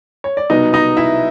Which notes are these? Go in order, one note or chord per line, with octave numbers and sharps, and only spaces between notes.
C#5
D5
C2 B2 F#3 B3 D#4 D#5
D#4 D#5
E4 E5